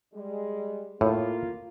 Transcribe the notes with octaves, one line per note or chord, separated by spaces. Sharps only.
G3 G#3
A2 A#3 F4